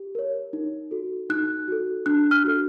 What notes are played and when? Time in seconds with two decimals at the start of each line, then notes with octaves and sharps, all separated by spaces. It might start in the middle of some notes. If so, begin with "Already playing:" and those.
Already playing: G4
0.15 A#4 C#5
0.53 D#4
0.91 F#4 A4
1.30 D#4 F#6
1.68 F#4 A4
2.06 D4 F#6
2.31 F6
2.44 F#4 A4